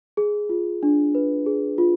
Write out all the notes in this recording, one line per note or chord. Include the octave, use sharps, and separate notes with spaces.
G#4
F4
D4
B4
G#4
F4